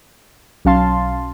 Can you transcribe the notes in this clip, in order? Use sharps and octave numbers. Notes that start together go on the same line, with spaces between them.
B1 F#3 C#4 F5 A5 C6